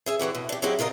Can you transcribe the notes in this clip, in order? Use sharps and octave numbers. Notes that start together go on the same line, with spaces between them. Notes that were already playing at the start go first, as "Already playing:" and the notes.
G#4 E5 G#5
D3 E3 F#4 G4
B2
D4 G4
F#3 G#3 C4 E4 F#4 G4
C3 F4 A#4 D#5